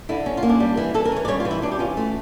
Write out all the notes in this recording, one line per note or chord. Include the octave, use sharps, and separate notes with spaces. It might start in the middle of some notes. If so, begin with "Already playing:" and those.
D3 E4
C#4
F4
A#3
D4
G3
E3
E3 A4
A#4
C#4 C#5
D5
G3 C#5
F4
E3
E4
E3 D4
G4
C#4 F4
A3